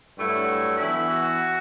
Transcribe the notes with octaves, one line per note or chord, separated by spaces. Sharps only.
G2 F#3 A3 E4 F#4
E3 B3 E4
F#4